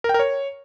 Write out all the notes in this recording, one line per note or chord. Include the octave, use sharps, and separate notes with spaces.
A#4
G5
A#4
C#5